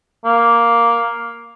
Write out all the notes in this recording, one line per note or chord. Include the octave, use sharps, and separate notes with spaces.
A#3